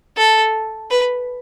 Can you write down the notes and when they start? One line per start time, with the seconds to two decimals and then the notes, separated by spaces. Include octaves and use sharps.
0.17 A4
0.91 B4